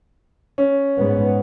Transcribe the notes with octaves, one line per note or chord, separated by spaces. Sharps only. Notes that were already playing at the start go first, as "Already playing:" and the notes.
C#4
G#2 B3